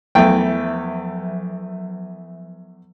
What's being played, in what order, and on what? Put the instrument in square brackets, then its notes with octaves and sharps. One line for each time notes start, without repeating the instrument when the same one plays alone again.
[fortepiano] E2 A3 G5 [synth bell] F3 F#3 E5